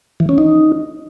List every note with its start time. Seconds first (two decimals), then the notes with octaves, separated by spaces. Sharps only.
0.20 E3
0.29 C#4
0.38 D#4